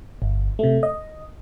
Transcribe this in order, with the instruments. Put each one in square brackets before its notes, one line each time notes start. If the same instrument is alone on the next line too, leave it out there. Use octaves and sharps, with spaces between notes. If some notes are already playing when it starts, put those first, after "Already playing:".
[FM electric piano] G1
C3 A3
D#5